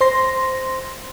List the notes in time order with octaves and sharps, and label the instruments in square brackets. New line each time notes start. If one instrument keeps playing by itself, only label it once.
[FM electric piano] C5 C6 A#6